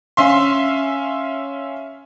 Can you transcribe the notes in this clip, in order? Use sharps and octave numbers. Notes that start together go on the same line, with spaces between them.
C#4 E5 F5 C6